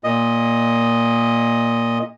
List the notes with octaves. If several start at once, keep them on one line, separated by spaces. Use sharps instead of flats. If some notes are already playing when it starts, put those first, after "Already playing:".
A#2 D#5